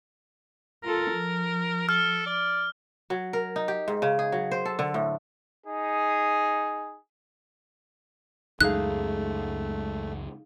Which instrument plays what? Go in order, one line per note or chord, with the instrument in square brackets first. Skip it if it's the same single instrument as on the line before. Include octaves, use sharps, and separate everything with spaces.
[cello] F4 A4 [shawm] A#4
[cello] F3
[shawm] A4 [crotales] F6
[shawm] D5
[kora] F#3
A#4
D#4
G4
G#2
C#3
G#4
F#3
C5
A4
D3
A2
[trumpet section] D#4 G#4
[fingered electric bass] C#2 F#2 G#3 [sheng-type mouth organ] A3 [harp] D#4 G#4 F5 [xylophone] F#6